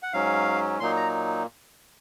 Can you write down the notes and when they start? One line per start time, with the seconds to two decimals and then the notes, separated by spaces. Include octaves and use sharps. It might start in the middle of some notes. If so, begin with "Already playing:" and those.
0.03 F#5
0.13 G#2 F#3 C#4 F5
0.80 A#2 F#3 A#3 D#4 C6
0.97 A#5